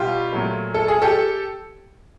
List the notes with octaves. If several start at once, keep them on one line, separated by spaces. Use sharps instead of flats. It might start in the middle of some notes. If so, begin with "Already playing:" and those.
Already playing: B2 G3 F4 G4
A#2 F#3 A3
A4
G#4
G4 A4